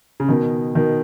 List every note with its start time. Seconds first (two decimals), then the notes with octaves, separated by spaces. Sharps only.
0.20 C#3
0.29 B2 D#3
0.75 B2 D#3